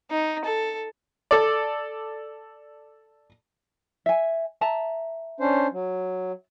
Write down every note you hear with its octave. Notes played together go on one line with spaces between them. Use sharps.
D#4
A4
A4 D5
E5 G#5
E5 A5 A#5
C#4 D4 C5
F#3